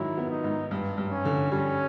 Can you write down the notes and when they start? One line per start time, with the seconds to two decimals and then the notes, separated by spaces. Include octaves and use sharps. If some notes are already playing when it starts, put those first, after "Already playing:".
Already playing: G#2 D#3 F#3 E4
0.17 B3
0.30 D#4
0.44 G#2
0.71 G2
0.98 G2
1.11 C#4
1.25 D3
1.52 G3 C#4